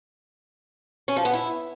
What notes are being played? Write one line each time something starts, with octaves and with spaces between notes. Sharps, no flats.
C#4
F3
B3
E4